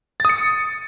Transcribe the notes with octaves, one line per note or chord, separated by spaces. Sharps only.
D#6 A6 C#7